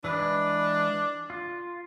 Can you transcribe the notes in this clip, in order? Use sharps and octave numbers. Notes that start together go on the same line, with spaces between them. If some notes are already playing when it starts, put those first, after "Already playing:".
E3 G#3 D4 B4
F4